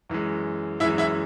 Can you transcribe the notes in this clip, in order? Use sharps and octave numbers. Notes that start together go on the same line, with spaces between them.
F#2 E3 G#3
F#2 E3 G#3 E4 E5
E4 E5